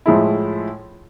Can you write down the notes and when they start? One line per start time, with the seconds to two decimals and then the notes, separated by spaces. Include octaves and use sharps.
0.06 A2 F3 G#3 E4